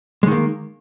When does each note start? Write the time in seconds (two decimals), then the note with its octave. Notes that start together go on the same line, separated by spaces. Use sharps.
0.23 G#3
0.27 D#3
0.32 A#3